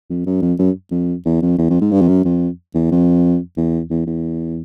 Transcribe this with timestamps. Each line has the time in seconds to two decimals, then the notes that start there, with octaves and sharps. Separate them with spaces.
0.10 F2
0.26 F#2
0.42 F2
0.59 F#2
0.91 F2
1.25 E2
1.42 F2
1.58 E2
1.70 F2
1.81 G#2
1.91 G2
2.01 F2
2.08 F#2
2.25 F2
2.75 E2
2.91 F2
3.57 E2
3.90 E2
4.06 E2